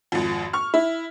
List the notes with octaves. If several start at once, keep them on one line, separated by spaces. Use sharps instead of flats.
G#1 F2
C#6 F6
E4